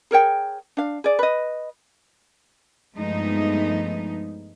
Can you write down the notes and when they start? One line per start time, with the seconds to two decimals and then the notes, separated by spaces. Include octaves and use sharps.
0.11 G#4 A#4 C#5 G5
0.77 D4 F5
1.04 G#4 D5
1.19 B4 D#5
2.96 G2 F3 G#3 A3 B3 D#4